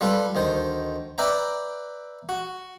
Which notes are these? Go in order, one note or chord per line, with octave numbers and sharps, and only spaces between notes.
G3 F4 A4 B4
D2 D#3 C5
B4 D5 E5 G5 A#5
F#4